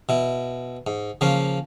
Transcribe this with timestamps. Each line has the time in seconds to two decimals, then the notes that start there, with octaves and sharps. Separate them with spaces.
0.09 B2 E4
0.87 G#2
1.21 C#3 F3 A#3 C#4